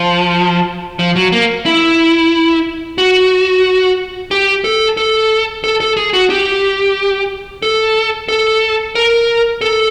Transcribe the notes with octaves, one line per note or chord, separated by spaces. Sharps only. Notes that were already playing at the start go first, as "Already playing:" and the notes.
Already playing: F3
F3
F#3
A#3
E4
F#4
G4
A4
A4
A4
A4
G#4
F#4
G4
A4
A4
A#4
A4